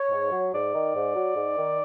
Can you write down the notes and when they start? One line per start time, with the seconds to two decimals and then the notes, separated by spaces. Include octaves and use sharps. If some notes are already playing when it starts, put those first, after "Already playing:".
Already playing: C#5
0.10 G#2
0.31 F#3
0.52 G#2 D5
0.73 D#3
0.94 G#2
1.14 F#3
1.36 G#2
1.57 D#3